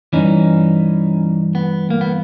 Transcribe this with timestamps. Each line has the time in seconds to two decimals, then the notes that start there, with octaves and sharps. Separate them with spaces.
0.13 G2 E3 C#4 D#4
1.55 B3
1.90 A#3
2.01 B3